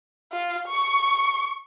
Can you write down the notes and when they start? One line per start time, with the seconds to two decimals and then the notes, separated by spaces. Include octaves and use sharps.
0.32 F4
0.68 C#6